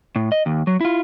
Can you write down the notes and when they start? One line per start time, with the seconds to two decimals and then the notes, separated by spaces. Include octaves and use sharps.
0.16 A2
0.32 D#5
0.46 D#2
0.67 F#3
0.81 E4 F4